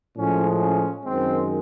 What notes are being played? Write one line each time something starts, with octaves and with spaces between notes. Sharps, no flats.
A2 F3 G#3 C#4
C#4
F#2 D#3 G#3 C4